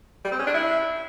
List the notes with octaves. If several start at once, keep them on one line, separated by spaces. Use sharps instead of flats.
G3
C4
C#4
D4
E4